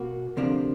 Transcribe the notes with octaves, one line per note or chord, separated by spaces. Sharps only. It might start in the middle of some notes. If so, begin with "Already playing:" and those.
Already playing: B2 A#3 F#4
D2 C3 F3 A#3 D4